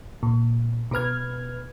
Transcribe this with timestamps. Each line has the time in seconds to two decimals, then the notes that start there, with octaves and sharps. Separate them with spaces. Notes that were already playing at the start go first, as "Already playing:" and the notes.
0.23 A#2
0.91 B2 B3 B4 F6 G#6